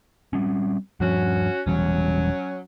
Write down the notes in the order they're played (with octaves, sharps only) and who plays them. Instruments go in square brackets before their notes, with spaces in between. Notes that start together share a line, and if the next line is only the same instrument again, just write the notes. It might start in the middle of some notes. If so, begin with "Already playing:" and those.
[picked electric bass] G3 C4 C#4
[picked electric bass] G2 F3 [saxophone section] C#4 F#4
[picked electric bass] E1 E3 G3 [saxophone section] F#3 C#4